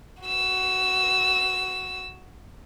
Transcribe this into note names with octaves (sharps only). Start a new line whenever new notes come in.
F#4 E6